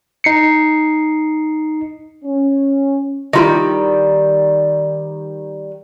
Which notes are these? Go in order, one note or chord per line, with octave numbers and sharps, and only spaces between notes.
D#4 C7 C#7
C#4
D#3 G3 E4 F4 D#5